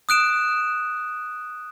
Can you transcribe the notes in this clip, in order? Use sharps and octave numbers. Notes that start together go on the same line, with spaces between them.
D#6 F#6 D7 E7